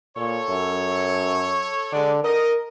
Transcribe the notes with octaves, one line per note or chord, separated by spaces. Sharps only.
A#2 A4 C#5
F#2
D3 G#3 D4 D5
A#4 D#5